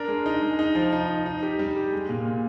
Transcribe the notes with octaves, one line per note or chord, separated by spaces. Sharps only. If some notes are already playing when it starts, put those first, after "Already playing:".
Already playing: D4 A#4
G#3
D#4
G#3
D#4
F3
D#4
D#4
D#4
G4
G3
G4
G#3
A#2
A#2